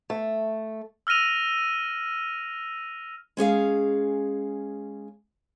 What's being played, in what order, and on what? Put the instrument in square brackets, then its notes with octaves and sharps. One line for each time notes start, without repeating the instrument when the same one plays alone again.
[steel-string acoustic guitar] A3
[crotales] E6 F6 A#6 D#7 F7
[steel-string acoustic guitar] G#3 C#4 G#4 F5